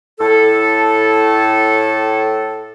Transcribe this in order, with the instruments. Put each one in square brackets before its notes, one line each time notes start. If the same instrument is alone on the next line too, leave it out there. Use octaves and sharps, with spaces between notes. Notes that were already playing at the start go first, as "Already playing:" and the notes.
[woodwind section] A2 A4